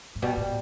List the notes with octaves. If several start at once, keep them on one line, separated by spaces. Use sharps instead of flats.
A2
B2 G3
A2